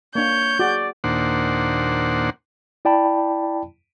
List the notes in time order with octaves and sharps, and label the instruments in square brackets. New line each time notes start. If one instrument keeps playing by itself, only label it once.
[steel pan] A#3 D4 [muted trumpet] C#5 [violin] G6
[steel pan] F#4 G#4 [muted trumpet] D5
[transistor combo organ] D#2 A#2 D4 C5 F#5
[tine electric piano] E4 D5 G5 A5 B5